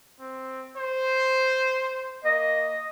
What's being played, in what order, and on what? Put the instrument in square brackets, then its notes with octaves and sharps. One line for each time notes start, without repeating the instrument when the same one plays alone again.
[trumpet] C4
C5
[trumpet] A#3 [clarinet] D#5